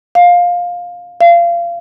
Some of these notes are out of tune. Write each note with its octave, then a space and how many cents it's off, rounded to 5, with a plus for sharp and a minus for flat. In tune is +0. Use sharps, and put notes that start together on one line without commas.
F5 +15
F5 -25